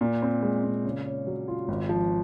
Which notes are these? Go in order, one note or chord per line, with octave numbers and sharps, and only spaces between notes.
A#2
C4
G#3
A#2
C#3
C#4
F#3
F4
G#1
F3